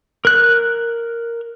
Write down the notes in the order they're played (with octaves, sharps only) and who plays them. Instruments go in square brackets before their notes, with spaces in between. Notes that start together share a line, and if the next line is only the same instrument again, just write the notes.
[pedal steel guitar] A#4 F#6